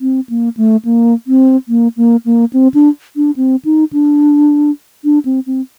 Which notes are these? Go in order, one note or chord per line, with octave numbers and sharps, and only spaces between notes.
C4
A#3
A3
A#3
C4
A#3
A#3
A#3
C4
D4
D4
C4
D#4
D4
D4
C4
C4